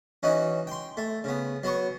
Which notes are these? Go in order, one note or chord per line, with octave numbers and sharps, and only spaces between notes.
E3 C#4 D#4 F#4
G5 C6
A3
C#3 B3
F#3 B3 C#6